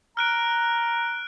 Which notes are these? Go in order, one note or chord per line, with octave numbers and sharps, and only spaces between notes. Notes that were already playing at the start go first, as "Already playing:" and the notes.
A#5 F6 F#6 D7